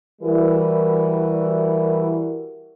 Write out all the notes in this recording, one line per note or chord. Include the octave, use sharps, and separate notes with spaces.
E3 G3 E4 F#4 A#4